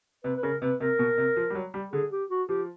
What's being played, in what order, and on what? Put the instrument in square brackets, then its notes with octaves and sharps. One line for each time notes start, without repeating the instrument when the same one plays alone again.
[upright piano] C3 [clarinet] B4
[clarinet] B4
[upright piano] C#3 [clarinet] A#4
[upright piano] C3 [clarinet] B4
[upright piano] C3 [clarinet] A#4
[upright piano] B2
C3
F3
G3
F#3
G3
[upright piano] D3 [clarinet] G#4
[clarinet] G4
F#4
[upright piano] F3 [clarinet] G4